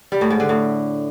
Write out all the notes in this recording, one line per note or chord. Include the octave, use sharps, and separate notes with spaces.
G3
A2
G#2
D3
A2